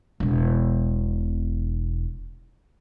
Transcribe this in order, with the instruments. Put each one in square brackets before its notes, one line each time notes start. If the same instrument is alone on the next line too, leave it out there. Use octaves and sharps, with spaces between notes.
[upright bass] E1 B2